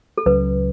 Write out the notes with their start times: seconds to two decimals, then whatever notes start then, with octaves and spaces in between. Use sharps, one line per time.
0.18 A4
0.26 C#2 C#3 F#3 C#4 B4